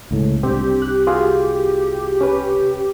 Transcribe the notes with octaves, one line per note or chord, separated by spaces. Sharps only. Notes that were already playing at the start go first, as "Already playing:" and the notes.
C#2 A2
C2 C4 D4 G4
F#6
F4 F#4 G#4
C#4 B4